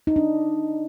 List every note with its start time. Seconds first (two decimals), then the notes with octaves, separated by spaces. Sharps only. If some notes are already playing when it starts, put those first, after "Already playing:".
0.07 D#4
0.16 D4